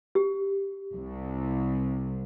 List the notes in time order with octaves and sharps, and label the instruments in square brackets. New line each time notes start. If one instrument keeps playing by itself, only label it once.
[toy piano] G4
[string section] C2